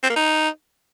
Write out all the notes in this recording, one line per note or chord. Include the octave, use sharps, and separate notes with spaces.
C4
A#3
D#4